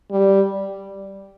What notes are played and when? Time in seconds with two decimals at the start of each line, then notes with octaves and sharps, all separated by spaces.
0.11 G3